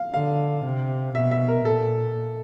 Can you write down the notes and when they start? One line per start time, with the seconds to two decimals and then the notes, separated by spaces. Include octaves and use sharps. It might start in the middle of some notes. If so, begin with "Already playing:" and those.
Already playing: F5
0.13 D3 F5
0.65 C3
1.15 B2 E5
1.31 E5
1.48 A#4
1.65 A#2 A4